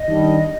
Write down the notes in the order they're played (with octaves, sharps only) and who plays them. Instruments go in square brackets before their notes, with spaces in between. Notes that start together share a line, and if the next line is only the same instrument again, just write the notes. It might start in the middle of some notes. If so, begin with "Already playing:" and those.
Already playing: [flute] D#5
[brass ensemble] D#3 G3 D4